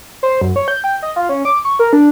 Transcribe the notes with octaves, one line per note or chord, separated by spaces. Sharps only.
C5
F#2
C#5
G6
G5
D#5
F4
C#4
D6
C#6
A#4
D4